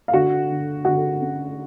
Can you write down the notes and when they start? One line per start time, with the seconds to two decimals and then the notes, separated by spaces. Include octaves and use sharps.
0.08 F5
0.13 D3 F#4 F#5
0.49 D3
0.85 D3 F#4 F#5
1.21 C#4